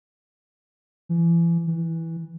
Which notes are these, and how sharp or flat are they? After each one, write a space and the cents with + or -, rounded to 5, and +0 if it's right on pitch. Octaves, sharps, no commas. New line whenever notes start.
E3 +35
E3 -5